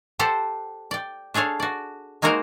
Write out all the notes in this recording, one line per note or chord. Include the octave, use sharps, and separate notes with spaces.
G4 A4 C5 F#5
D5 G5
D4 G#4 A4 C#5 F5
F#4 D5
G#3 A#3 D#4 F#4 A#4 C5